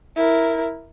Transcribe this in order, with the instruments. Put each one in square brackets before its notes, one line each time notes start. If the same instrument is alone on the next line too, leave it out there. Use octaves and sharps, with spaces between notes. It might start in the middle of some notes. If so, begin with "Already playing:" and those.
[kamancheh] E4 A#4